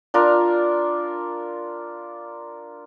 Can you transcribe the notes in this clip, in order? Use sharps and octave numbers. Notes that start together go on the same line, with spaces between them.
D4 F4 A#4